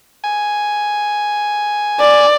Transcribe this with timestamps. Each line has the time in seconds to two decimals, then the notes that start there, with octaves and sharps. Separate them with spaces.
0.24 G#5
2.00 D5